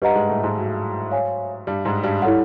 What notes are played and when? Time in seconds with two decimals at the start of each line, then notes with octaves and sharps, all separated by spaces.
0.02 G2 G3 G4 B4 D#5 F#5 A#5
0.15 G#2 G#3
0.29 A2 A3
0.43 G#2 G#3
0.57 F#3
1.12 C#5 F5 G#5
1.67 G2 G3
1.85 G#2 G#3
2.03 G2 G3
2.22 G3 E4 A4 C#5 F#5